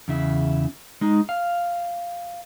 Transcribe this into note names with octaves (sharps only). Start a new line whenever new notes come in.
E2 C#3 E4
G#3 D#4
F5